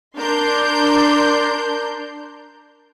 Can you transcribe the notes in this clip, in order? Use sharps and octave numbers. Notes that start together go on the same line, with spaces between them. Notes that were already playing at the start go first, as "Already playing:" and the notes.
D4 A#4 C6 G6